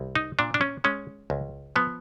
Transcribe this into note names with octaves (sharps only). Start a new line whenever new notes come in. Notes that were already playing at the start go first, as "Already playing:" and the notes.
Already playing: C2
D#4
A#2 D4
D4
C#4
G#3 C#4
C#2
F3 B3